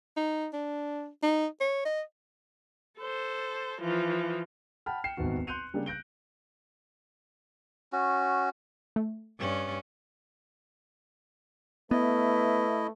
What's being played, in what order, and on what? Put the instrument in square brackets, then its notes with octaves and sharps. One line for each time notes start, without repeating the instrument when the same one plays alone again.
[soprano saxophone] D#4
D4
D#4
C#5
D#5
[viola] A4 C5
E3 F3
[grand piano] F#5 G5 A5 B5 F6
G5 C7 C#7 E7
D#1 G#1 E2 D#3 F#4
C6 F#6 G6 C#7 D#7 F7
C#3 G3 A#3 D4 G#4
F#6 G6 A#6 D7 G7
[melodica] C#4 F#4
[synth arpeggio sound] A3
[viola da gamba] G2 C#4
[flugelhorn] A3 [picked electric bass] B3 [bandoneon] E4 D#5 [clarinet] B4